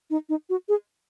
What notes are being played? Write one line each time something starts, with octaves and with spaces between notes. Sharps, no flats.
D#4
D#4
F#4
G#4